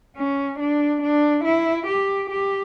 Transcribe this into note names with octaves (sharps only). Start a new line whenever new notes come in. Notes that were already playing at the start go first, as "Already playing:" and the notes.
C#4
D4
D4
E4
G4
G4